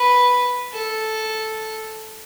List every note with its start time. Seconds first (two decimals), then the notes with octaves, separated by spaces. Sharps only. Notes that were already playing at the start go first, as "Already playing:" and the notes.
Already playing: B4
0.73 A4